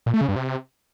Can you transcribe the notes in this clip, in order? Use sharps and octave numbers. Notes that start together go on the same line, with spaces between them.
A#2
A3
C#3
G2
C3